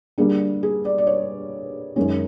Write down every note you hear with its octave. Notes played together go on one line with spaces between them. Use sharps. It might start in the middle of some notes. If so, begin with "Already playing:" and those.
D3 G3 A#3 D4 G#4
G#4
D5
D5
C#5
F#2 D#3 G#3 C#4